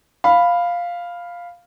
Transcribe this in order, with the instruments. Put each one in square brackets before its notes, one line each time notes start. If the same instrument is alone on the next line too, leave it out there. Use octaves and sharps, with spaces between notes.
[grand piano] F5 B5